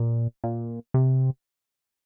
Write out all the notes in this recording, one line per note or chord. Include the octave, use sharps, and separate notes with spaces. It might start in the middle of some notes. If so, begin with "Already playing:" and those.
Already playing: A#2
A#2
C3